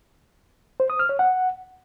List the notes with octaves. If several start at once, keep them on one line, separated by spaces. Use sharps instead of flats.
C5
D#6
F6
C#5
F#5